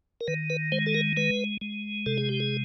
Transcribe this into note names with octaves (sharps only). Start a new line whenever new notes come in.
A#4
D#3 B4
B4
G#3 C5
A4
A#4
G#3 B4
G#3
C3 A4
G#4
G4
G#4